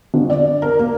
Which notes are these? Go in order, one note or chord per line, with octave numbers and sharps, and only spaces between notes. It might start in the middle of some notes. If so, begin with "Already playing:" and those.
G1
D5
A#4
A#3